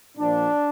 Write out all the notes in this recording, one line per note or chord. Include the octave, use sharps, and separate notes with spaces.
A#2 F3 D4